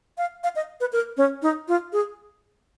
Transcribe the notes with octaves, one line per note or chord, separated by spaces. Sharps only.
F5
F5
D#5
B4
A#4
C#4
D#4
F4
G#4